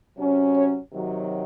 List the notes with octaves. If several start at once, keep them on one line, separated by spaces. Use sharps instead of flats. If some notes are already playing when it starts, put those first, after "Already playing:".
C3 F#3 C#4
C#5
C3 D#3 F#3